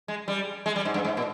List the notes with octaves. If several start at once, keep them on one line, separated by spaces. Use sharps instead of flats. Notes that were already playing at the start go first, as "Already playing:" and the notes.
G#3
G3
G#3
G3
G#2
G2
G#2
A#2